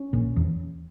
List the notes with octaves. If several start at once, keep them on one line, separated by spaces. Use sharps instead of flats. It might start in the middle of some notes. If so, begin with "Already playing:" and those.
Already playing: C#4
A#1 A#2
E2